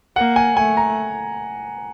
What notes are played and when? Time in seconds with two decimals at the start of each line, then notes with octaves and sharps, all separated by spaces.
0.16 A#3 F#5
0.36 G#5
0.57 A3 G#5
0.77 A#5